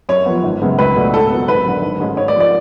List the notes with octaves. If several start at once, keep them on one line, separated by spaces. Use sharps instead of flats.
F#2 C#5
F3 B3
G#1
F#2 C#3 G#3 B3
C#2 B4
B2 A3 D4
G#2 A4
F#3 B3
G#1 B4
F#2 D3
G#1
G#2 G#3 C#4
G#2 C#5
D5
F3 G#3
D5